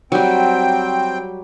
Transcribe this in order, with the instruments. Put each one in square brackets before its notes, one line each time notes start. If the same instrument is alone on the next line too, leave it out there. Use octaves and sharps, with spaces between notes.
[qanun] F#3 G3 [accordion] C4 G5